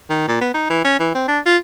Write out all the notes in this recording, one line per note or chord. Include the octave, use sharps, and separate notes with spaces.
D#3
A#2
B3
D#4
E3
C#4
E3
C4
D4
F4